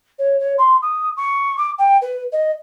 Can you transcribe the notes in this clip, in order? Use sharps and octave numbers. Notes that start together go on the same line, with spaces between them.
C#5
C#5
C6
D#6
C#6
D6
G5
B4
D#5